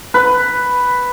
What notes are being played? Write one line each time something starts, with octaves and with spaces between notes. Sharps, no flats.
B4